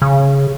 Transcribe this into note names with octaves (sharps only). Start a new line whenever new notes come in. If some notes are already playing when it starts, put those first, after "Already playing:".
C#3